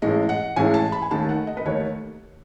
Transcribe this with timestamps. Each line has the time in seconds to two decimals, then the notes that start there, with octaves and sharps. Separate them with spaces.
0.02 A1 A2 G#3 D#5
0.29 F#5
0.56 A1 A2 G#3 G#5
0.74 A5
0.92 B5
1.02 G#5
1.11 D#2 D#3 A3 A5
1.29 F#5
1.47 D#5
1.57 B4
1.66 D#2 D#3 A3 C#5